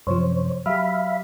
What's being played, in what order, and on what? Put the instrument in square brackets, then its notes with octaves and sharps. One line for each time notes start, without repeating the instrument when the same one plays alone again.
[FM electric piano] F#2 C3 F3 [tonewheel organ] C5 C#5
[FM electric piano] F#3 G4 [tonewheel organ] E5 F5 B5